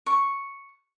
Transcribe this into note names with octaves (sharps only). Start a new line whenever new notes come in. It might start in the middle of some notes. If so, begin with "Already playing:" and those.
C#6